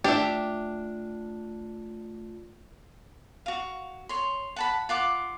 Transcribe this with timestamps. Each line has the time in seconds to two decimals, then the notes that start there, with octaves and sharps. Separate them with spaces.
0.04 A3 D4 F4 G4 E5
3.46 F#4 F5
4.09 C#5 C6
4.56 F#5 A5 B5
4.89 F4 F#5 D6